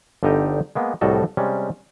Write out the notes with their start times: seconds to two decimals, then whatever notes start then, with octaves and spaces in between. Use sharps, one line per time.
0.23 G1 D3 G3 D#4 G4 D#5
0.75 G#3 A#3 B3
1.01 C2 A2 G3 F#4 A4 D#5
1.37 C3 G3 G#3 C#4